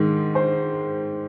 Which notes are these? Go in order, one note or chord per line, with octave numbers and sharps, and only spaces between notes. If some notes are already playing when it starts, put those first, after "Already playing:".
Already playing: G#2 D#3 G#3
C5